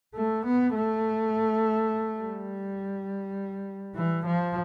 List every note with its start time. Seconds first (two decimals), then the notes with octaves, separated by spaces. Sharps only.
0.15 A3
0.45 B3
0.74 A3
2.20 G3
3.95 E3
4.25 F3